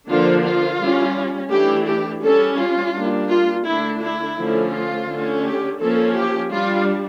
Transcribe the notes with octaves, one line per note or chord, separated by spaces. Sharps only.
D3 F3 A#3 D4 F4
F4
G3 C#4
E3 A3 D4 G4
G4
G3 C#4 A4
F4
G3 A#3 D4
F4
D3 A3 D4 E4
E4
D3 F3 A3 C#4
F4
D3 A3 C#4
G4
F3 A#3 C#4 A4
G4
G3 D4 F4